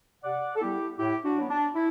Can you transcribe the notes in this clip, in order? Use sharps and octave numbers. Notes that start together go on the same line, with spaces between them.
C3 D5 F#5
A4
G3 B3 E4 G4
A2 E4 G4
D4 F#4
F#3 B3
D4
E4